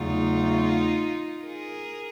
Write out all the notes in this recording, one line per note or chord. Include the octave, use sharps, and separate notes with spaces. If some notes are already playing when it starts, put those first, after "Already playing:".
Already playing: E2 C#3 F#3 A3 D#4 F4
G#4 A#4